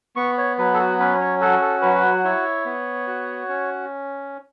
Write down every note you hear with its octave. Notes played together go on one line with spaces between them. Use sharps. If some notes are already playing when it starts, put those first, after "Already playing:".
B3 C#6
C#5
F#3 B4
A4
F#4
C#4 B4
C#5
F#4 A4
A4
F#3 B4
E4 C#5
B3
F#4
C#4